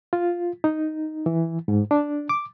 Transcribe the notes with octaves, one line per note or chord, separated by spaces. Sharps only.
F4
D#4
E3
G#2
D4
D6